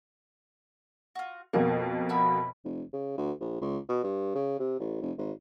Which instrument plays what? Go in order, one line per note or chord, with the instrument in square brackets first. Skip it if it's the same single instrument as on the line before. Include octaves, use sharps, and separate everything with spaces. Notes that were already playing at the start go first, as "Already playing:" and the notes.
[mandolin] F4 F#4
[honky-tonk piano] F2 B2 A#3 [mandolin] F#4
[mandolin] E4 F#4 B5
[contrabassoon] F1
C#3
D2
A#1
C#2
B2
G2
C#3
C3
A1
F1
G#1